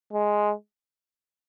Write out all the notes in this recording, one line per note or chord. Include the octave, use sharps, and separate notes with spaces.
G#3